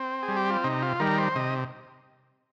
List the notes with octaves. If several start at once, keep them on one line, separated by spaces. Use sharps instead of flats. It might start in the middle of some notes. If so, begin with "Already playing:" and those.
Already playing: C4
G#4
G3
G4
F4
C3 D#4
F4
D#3 G3 A#4
C5
C3 D#5